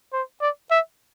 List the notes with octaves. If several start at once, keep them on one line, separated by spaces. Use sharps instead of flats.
C5
D5
E5